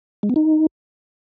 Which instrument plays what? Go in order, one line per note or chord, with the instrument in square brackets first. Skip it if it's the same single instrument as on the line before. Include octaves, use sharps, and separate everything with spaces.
[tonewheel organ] G#3
B3
D#4